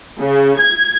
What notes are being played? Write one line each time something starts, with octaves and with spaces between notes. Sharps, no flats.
C#3
G#6